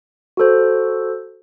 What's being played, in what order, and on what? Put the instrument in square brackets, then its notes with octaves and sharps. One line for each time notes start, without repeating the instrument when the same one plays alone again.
[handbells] F#4 A4 C5